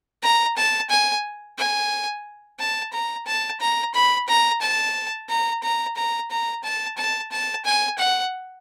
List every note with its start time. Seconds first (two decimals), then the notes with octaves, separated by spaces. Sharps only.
0.23 A#5
0.57 A5
0.90 G#5
1.58 G#5
2.59 A5
2.93 A#5
3.26 A5
3.60 A#5
3.94 B5
4.28 A#5
4.61 A5
5.29 A#5
5.63 A#5
5.96 A#5
6.31 A#5
6.64 A5
6.97 A5
7.31 A5
7.65 G#5
7.98 F#5